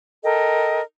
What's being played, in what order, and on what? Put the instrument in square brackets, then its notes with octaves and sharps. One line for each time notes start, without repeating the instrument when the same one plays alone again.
[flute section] A4 A#4 D#5 G5